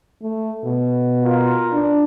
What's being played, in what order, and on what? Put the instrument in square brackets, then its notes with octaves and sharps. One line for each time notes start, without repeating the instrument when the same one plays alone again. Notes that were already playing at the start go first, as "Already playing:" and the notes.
[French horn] A3
B2
[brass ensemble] F4 A#4
[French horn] D4